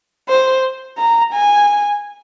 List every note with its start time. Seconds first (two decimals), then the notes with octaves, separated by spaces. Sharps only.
0.29 C5
0.98 A#5
1.33 G#5